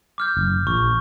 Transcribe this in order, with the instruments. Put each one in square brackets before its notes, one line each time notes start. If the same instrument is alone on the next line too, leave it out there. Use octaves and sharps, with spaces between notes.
[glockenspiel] D6 F6 G6
[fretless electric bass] F#1
[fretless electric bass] A#1 [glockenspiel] C#6